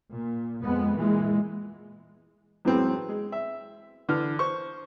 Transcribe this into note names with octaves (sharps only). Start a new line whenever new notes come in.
A#2
F2 G#3 B3
A#2 E3 G#3
F#2 A2 E3 G#3 B3 C4
G#3
E5
D3 E3 F6
C5 C#6